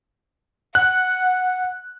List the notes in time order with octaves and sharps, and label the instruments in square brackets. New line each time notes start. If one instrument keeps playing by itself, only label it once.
[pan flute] F#5 [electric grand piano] F#6